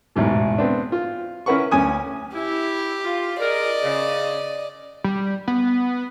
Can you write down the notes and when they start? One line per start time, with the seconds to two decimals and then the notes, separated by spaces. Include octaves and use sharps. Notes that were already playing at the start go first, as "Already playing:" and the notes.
0.16 A1 E2 G#2 B2
0.58 B3 C4 D4
0.92 F4
1.46 C#4 E4 A#4 B4 F#5 C#6
1.71 D2 C#4 G#5 D#6
2.35 E4 G4
3.05 F4
3.40 G#4 A#4 D5 D#5
3.83 C#3
5.04 G3
5.48 B3